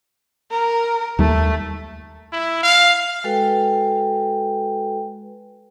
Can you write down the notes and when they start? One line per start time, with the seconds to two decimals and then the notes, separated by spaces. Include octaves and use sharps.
0.51 A#4
1.19 D#2 G3 A3
2.33 E4
2.63 F5
3.24 G#3 F#4 A4 B4 G5